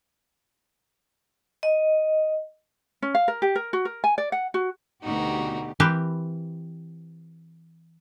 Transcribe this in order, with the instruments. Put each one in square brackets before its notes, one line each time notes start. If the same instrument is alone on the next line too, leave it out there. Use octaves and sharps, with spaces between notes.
[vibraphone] D#5
[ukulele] C#4
F5
A#4
G4
A#4
F#4
A#4
G#5
D5
F#5
F#4
[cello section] D2 B2 G4 [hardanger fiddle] D#4 F#4
[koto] E3 C4 G4 A#4 B4